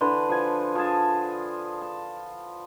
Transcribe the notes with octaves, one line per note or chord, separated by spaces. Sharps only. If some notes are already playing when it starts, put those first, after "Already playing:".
D3 E3 B4 C6
F3 G#5
F3 G#4 G#5 A5
A5